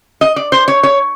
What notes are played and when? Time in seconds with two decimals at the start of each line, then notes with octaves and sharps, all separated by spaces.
0.21 D#5
0.36 D5
0.52 C5
0.68 C#5
0.83 C#5